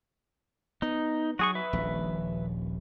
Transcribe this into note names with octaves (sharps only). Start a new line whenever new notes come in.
B3 D#4
F#3 F#4 G#4 C#6
B4 E5
D#1 A#1 D#2